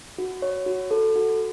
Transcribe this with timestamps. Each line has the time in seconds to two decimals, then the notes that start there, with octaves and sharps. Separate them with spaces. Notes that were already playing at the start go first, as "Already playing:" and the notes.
0.18 F#4
0.42 C#5
0.66 F#4
0.91 A4
1.16 F#4